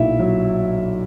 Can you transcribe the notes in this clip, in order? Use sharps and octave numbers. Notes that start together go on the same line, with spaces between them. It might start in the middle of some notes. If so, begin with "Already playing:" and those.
Already playing: B1 A#2 E4 E5
F#3